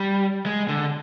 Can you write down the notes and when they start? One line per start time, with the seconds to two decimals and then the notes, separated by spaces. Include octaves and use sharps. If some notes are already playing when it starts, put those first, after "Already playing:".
Already playing: G3
0.46 G#3
0.68 D3